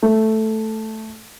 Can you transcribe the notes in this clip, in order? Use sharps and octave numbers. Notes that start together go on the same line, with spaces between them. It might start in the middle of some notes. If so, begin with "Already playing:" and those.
A3